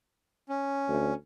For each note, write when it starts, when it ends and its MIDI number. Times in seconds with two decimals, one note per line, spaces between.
0.49 1.14 61
0.88 1.12 38